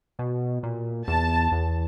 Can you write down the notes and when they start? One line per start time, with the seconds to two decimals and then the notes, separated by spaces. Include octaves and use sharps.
0.19 B2
0.63 A#2
1.07 E2 A5
1.52 E2